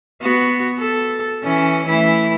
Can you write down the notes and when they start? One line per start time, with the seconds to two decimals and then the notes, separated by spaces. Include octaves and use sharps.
0.21 B3 F#4
0.79 A4
1.43 E3 C#4
1.86 E3 A3 E4